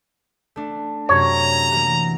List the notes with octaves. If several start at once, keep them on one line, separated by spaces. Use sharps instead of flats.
A3 D4
F#2 C3 F#3 C#5 A#5
E3 F#3 A#3